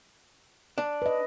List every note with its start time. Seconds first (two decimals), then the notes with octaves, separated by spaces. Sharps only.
0.78 D4
1.02 B4 D#5